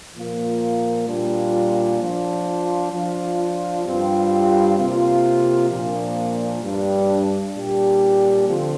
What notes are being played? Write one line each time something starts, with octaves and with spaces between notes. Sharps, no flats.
A#2 F3 A#3 F4
A#2 G3 D4 F4
F3 D4 F4
F3 D4 F4
G2 G3 C4 F4
C3 A#3 F4
A#2 F3 A#3 D4 F4
G2 G3 D4
A#2 G3 D4 G4
D3 F3 C4 F4